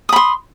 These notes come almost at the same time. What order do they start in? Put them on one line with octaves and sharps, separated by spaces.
D#6 B5 C6